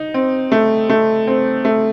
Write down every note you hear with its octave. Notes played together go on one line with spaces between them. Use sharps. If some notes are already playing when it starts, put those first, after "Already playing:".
Already playing: D#4
C4
A3
A3
C4
A3